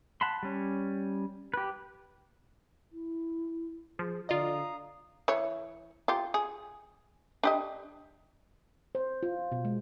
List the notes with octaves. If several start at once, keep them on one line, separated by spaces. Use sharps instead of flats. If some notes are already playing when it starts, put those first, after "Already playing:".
F#5 A5 B5 C6
G3 C#4
G4 B4
E4
F3 G#4
D3 F4 D5 D#5 F5 A#5 D#6
E3 C#5
F4 G4
G#4
D4 G4 D#5
C5
F4
B2
G#3